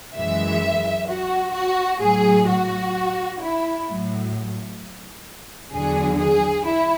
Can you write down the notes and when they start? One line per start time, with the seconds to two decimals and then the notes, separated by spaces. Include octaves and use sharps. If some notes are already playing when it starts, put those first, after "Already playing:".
0.15 F#2 E3 G#3 E5
1.08 F#4
1.53 F#4
2.01 A2 F#3 G#4
2.47 F#4
3.40 E4
3.86 A2 F#3
5.72 E2 D3 F#3 G#4
6.18 G#4
6.65 E4